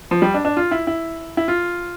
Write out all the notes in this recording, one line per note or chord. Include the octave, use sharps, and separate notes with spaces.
F3
G3
D4
D4
F4
E4
E4
E4
F4